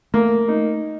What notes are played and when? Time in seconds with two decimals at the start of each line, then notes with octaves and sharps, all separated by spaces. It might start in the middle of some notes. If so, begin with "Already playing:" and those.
0.14 A3 A#3
0.48 D#4